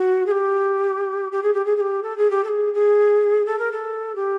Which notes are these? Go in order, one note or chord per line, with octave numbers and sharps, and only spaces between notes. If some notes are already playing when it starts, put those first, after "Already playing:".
Already playing: F#4
G#4
G4
G4
G#4
G4
G#4
G#4
G4
A4
G#4
G4
A4
G#4
G#4
A4
A#4
A4
G4